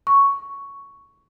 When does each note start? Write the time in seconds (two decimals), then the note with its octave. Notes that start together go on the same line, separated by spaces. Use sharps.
0.07 C#6